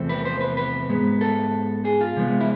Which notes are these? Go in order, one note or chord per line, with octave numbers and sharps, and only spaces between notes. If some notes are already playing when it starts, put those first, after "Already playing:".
Already playing: E2 C3 F3 A3 C4
B4
C5
B4
B4
G#2 G#3 B3
A4
G#4
F4
C3 F3 G#3 B3
E4